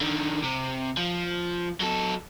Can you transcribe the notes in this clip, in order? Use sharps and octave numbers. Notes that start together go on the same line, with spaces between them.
D3 D#3
C3
F3
F#3 A4